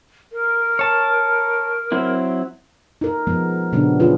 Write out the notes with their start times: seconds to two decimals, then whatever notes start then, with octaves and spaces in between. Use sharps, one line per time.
0.33 A#4
0.79 C#5 A5
1.92 F#3 C4 E4
3.01 D#4 A#4
3.27 F3 G#3 B3
3.72 A#2 C#3 G3 B3 C#4 D4
4.00 E3 B3 C#4 F4 G#4 B4